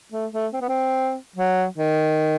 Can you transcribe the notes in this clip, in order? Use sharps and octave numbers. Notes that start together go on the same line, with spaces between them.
A3
A3
C4
B3
C4
F#3
D#3